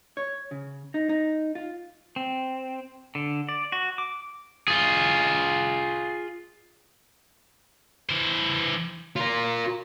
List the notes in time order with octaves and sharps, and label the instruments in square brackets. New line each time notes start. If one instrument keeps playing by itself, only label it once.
[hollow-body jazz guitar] C#5
C#3
D#4
D#4
F4
[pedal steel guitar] C4
D3
D5
F#4
D6
[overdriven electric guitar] F4 G#4
[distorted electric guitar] E3 C5
F4 A#4